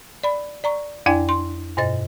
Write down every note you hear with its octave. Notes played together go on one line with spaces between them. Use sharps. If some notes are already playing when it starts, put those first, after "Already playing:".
D5 B5
D5 A#5 C#6
F2 D4 E4 D5 G5 G#5
C6
G2 B2 C5 D#5 A6